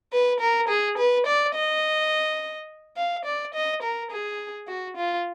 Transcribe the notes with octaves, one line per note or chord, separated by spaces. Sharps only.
B4
A#4
G#4
B4
D5
D#5
F5
D5
D#5
A#4
G#4
F#4
F4